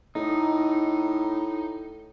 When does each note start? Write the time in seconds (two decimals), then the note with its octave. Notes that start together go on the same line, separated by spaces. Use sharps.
0.15 A2 D#4